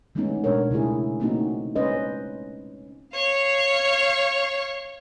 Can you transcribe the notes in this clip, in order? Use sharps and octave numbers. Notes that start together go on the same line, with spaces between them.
E3 G#3 A3 B3 C#4 D#4
B2 G#3 D4 A#4 C#5
C#3 A3 E4 G#4
A3 A#3 C4 C#4 D#4 F#4
G#3 C#4 B4 C5 D#5
C#5 F5